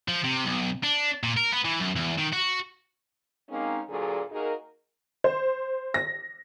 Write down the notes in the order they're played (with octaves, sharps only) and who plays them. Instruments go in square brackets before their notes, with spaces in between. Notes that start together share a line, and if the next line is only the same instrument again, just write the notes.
[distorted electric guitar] F3
C3
B1
D4
A#2
A#4
B3
E3
F#2
E2
D#3
F#4
[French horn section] G#3 A#3 C4 C#4 D#4 G#4
D2 A#2 D3 F#3 G#4
A#3 D#4 F#4 G#4 A#4
[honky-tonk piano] C5
A#6